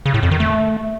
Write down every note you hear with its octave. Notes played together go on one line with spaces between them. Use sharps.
C#3
A2
F2
D#3
A3